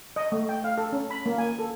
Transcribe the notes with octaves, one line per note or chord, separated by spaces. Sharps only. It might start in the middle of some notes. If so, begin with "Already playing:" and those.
D#5
A3
G5
F5
A4
C#4
B5
A#3
G#5
A4